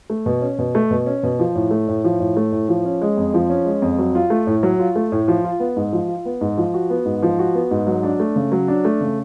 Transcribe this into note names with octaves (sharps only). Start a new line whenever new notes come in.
A3
B2
C#4
B2
A3
B2
C#4
B2
F3
A2
A3
A2
F3
A2
A3
A2
F3
C#4
G#3
F2
F3
C#4
G#3
F2
F#3
F4
A3
A2
F#3
F4
A3
A2
F3
F4
B3
G#2
F3
F4
B3
G#2
F3
F#4
B3
G#2
F3
F#4
B3
G#2
F#3
D4
A3
C#3
F#3
D4
A3
C#3